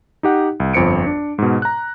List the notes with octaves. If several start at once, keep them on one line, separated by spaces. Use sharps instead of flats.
D#4 G4 F#5
C2
G1 F2 C5 C#7 D7
D4
G#2 B2
A#5 F#6